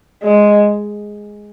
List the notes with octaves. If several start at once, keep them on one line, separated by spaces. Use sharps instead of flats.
G#3